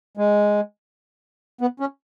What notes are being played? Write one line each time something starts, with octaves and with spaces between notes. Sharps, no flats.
G#3
B3
C#4